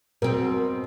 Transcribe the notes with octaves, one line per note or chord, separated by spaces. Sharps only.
B2 C4 A#4